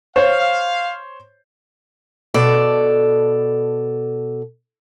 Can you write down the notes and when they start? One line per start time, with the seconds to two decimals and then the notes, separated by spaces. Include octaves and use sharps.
0.16 C5 C#5 F5
2.34 B2 A4 D5